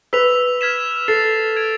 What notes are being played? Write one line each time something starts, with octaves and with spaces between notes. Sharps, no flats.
B4 E6 B6 F7
F6 G#6 B6 E7
A4 A6 C7 F7
G#6 D7 F7